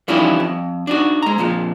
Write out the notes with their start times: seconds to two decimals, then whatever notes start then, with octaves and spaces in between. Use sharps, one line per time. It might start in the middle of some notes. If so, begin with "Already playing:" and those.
0.08 E3 F3 G3 C#4 D#4 E4
0.40 F2
0.87 D4 D#4 F#4
1.22 G#3 A#5
1.38 F2 A#2 F3